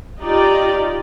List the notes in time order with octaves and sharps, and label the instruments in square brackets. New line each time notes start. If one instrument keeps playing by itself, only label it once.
[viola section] D#4 F4 G4 D5